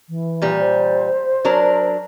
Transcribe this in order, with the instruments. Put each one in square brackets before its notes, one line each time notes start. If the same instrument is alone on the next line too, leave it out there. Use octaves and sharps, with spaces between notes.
[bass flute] E3
[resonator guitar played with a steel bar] A#2 G3
[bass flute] C5
[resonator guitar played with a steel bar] F#3 D4 A#4